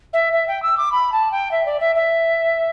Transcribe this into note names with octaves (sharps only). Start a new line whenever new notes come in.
E5
E5
G5
E6
D6
B5
A5
G5
E5
D5
E5
E5